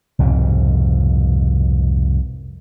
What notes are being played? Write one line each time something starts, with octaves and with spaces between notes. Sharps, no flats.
C2 F2 G#2 B2